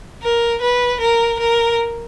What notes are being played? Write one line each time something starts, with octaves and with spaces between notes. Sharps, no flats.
A#4
B4
A#4
A#4